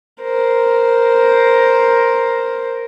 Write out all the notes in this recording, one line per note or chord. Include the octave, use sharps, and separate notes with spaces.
A#4 C5